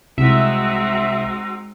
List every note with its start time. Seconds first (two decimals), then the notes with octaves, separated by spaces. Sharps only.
0.18 C2 G#3 C4 D#4 F#4 E5 E6